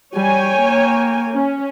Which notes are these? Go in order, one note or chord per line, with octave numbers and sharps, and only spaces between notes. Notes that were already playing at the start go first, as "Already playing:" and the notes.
G3 C#5 G5 G#5
A#3
C#4